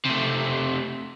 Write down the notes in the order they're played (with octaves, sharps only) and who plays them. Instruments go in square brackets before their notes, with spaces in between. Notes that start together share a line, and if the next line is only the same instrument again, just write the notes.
[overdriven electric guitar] C3 A3